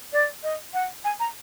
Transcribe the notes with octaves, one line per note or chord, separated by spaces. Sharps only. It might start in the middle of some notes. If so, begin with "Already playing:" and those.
D5
D#5
F#5
G#5
A#5